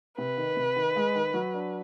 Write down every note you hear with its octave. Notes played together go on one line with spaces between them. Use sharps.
C3 B4
D#3
C3
D#3
G#3
D#3
F#3
D4